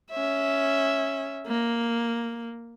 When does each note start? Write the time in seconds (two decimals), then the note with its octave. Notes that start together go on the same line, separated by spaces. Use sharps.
0.11 C#4 E5
1.47 A#3